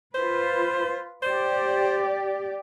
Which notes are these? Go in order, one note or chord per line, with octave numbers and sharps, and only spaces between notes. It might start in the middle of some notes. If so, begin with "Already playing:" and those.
F4 B4 C5
G4 C5 D5